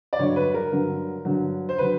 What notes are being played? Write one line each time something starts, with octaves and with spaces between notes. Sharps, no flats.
D5
G2 D3 F#3 C#5
B4
A#4
G2 D3 F#3
G2 D3 F#3
C5
D3 F#3 B4